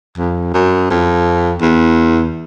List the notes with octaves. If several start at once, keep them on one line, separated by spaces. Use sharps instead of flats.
F2
F#2
F2
E2